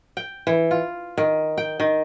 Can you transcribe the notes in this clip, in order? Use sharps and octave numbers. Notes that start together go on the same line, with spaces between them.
G5
E3
F4
D#3
G5
D#3